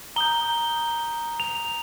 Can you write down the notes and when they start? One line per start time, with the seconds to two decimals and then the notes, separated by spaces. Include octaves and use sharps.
0.16 A#5 D#6 G6 G7
1.40 F7